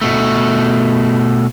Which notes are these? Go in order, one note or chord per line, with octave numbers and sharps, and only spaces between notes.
B2 A3